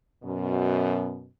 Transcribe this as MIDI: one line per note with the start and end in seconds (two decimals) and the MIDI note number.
0.24 1.28 42
0.24 1.28 47